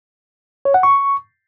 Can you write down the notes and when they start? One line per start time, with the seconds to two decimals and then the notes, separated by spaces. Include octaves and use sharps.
0.65 C#5
0.74 F#5
0.83 C#6